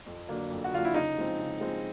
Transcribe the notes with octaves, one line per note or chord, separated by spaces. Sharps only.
F2
D3 F#3 A#3 D4
F2
F#4
D3 F#3 A#3 D4 F4
E4
C#3 D#4
F3 G#3 C4
C#3
F3 G#3 C4